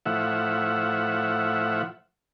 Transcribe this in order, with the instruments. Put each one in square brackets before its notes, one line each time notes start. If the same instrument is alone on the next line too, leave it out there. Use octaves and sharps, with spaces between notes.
[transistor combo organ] A2 F3 E5 F#5